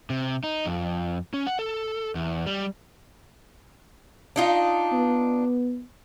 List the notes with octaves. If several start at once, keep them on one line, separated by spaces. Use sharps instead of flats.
C3
D#4
F2
C#4
F#5
A4
E2
G3
D4 D#4 F4
B3